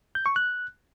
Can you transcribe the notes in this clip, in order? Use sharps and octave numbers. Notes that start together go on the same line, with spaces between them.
G6
C#6
F#6